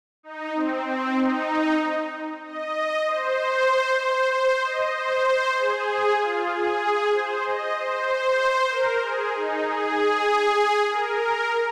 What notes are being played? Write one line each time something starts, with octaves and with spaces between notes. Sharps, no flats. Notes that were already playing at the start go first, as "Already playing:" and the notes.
D#4
C4
C4
D#4
D#5
C5
C5
C5
D#5
C5
G#4
F4
G#4
C5
D#5
C5
C5
A#4
G#4
D#4
G#4
A#4